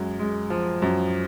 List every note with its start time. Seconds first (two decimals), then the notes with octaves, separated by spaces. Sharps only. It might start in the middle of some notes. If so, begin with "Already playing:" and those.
Already playing: F#2 G#3
0.19 G#3
0.50 F3
0.82 F#2